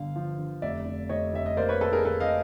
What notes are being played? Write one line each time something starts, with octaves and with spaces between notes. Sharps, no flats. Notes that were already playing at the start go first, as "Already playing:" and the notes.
Already playing: G1 D3 F5
F3
D3
F1 D5 E5
F1
F1 C#5 D#5
F1 E5
D#5
A#3 C5 D5
B4 C#5
A#3 A4 B4
G#4 A#4
A#3 A4 B4
D#5 F5